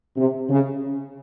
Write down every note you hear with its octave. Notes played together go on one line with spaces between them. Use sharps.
C3
C#3